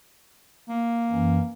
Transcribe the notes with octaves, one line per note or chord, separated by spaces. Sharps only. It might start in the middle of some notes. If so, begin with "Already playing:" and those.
A#3
F#2 E3 C#4